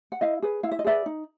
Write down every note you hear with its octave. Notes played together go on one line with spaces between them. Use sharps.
F#5
E4 D#5 F5
G#4 B4
E4 F5
E5
D#5
G#4 B4 D5 E5
D#4